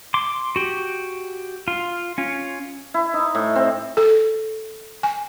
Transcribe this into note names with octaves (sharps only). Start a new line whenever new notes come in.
C6 D6
F#4 G4
F4
C#4 F4
E4
D#4
A2
C4
A4
G#5